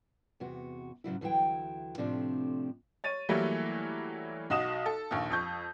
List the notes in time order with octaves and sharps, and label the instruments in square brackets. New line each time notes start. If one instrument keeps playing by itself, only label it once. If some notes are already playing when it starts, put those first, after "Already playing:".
[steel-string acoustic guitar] E2 C3 F#4
G#2 C#3 F#3 E4
D2 E3 F#3 E4 G5
A2 C3 F3 A3 C4 D4
[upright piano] C#5 A6 D#7
E3 F#3 G3 A3 A#3 E4
B1 F#4 D#5 D#6 E7
A4
A#1 D#2
F2 C#6 G6